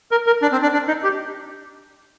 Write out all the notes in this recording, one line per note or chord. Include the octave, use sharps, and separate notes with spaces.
A#4
A#4
D4
C4
D4
D4
D#4
G4